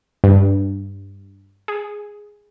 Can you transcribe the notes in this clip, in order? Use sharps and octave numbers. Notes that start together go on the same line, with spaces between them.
G2
G#4